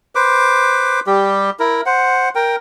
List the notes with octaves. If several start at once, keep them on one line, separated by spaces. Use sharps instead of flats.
B4 C5 D6
G3 G4
E4 A#4
C5 F#5
A#4 G5